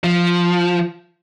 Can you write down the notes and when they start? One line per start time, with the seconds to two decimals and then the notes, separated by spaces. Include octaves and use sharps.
0.04 F3